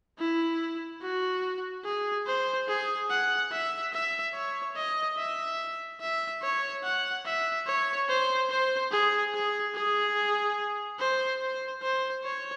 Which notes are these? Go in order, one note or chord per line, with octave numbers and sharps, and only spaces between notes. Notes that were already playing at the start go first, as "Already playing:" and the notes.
E4
F#4
G#4
C5
G#4
F#5
E5
E5
C#5
D#5
E5
E5
C#5
F#5
E5
C#5
C5
C5
G#4
G#4
G#4
C5
C5
C5
C#5